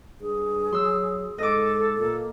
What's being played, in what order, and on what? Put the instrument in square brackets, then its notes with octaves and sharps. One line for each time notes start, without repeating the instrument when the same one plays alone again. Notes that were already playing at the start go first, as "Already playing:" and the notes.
[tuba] G2 [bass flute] G#4
[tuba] F#3 [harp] C6 E6
[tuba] G#2 [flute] A4 [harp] D#5 D6
[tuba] A#2 [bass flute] A#3